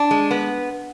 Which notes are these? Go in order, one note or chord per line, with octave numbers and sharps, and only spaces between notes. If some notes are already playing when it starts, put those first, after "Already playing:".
Already playing: D4
G#3
B3